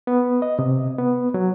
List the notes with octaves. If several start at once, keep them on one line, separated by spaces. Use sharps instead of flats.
B3
D#5
C3
B3
F#3